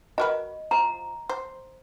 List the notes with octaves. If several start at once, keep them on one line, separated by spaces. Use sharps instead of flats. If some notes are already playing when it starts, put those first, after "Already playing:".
F#4 A#4 B4 D#5
F3 C5 A#5
C5